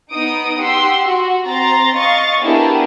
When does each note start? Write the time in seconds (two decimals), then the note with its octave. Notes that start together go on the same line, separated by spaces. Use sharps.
0.12 B3 D#4 D#6 D7
0.60 G4 F#5 C6 E6
1.05 F#4
1.48 C4 A#5 C6 A6
1.95 D#5 F5 C#6 A6
2.42 B3 D4 E4 G4 G#4 A#4